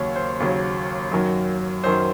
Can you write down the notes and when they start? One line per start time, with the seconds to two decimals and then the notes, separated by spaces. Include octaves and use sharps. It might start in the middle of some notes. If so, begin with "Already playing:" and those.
Already playing: D#2 C#3 F#3 C#5
0.16 C5
0.40 D#2 C#3 F#3
1.11 F#2 D#3 F#3
1.84 F#2 D#3 F#3 C5